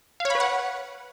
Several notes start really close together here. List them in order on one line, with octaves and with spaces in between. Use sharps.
F5 C#5 B5 B4 F#5